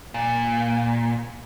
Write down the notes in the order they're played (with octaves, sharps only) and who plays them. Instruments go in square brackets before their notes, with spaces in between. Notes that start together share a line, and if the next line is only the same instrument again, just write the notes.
[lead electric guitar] A#2